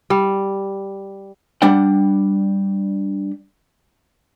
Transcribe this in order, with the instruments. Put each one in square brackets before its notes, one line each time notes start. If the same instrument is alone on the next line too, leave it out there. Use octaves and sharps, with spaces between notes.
[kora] G3
[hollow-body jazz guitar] G3 D4 D5 F#5 G5